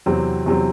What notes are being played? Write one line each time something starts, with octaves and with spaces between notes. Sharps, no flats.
E2 C3 F#3 C4
E2 C3 F#3 C4